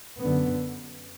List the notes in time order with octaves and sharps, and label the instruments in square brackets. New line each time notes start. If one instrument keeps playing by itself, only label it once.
[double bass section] F#2 D3 B3